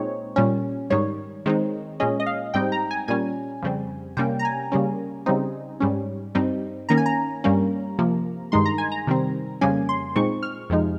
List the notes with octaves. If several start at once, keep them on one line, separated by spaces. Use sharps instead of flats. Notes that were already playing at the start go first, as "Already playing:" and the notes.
Already playing: A#2 G#3 C4 D#4 C#5
A#2 G3 C#4
G#2 D#3 G3 C#5
D#3 G#3 C4 D#4
A#2 G#3 C#4 D#5
D#5
F5
G#2 G3 C4 D#4 G5
A#5
G#5
A#2 G3 C#4 G#5
F2 C#3 G3 C4
C3 G3 A#3 C#4 G5
A#5
G#5
C#3 G3 A#3 C#4
C#3 G3 C4 D#4
G#2 G3 C#4
G2 G3 C4 D#4
D#3 A#3 C#4 A#5
G#5
A#5
G2 G3 A#3 C#4
C3 F3 A#3
G2 D#3 G#3 D#4 C6
A#5
G#5
A#5
C3 D#3 G3 C4
F2 C#3 G3 A#3 C#4 G#5
C6
A#2 G#3 C4 D#4 C#6
F6
F2 C3 F3 G#3 D#4